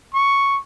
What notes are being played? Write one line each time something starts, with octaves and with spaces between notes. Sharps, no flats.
C#6